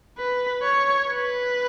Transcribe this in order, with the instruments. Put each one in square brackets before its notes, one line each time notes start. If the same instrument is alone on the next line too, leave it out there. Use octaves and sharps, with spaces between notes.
[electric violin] B4
C#5
B4